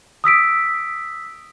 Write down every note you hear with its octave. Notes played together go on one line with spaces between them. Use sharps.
D#6 E6 B6 D7